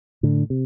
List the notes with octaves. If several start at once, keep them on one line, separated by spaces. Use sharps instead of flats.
A2 D3
C3